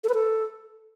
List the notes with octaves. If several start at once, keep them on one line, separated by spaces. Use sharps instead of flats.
A4
B4
A4